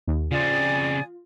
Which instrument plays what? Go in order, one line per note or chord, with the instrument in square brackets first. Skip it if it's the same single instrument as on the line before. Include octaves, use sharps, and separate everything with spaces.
[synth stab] D#2
[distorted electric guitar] C#3 C4 [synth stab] F4 [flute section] D5 G#5 D#6